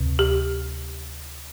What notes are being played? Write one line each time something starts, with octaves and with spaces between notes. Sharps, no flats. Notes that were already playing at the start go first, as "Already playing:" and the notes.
Already playing: D2 C3
G4